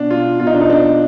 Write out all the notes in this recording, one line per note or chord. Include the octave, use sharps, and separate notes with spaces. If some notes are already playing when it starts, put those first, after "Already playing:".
Already playing: B2 D4
F4
B2 F4
D#4
D4
D#4
D4